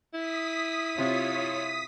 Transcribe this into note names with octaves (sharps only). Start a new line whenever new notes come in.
E4 D#6 B6
C3 F4 C#5